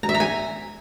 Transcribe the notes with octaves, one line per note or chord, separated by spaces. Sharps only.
A#5
E5
A#5
G#5